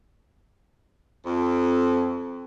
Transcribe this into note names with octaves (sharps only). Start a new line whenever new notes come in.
F2